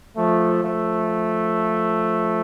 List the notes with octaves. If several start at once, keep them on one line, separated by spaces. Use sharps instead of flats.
F3 A3
F3 A3